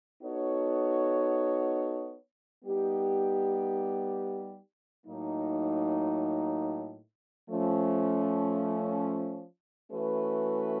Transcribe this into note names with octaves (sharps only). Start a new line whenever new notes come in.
B3 D#4 F#4 A4 C#5
G3 B3 D#4 G4
A2 F#3 A#3 D#4
F3 A3 C#4
E3 A3 C#4 F#4 B4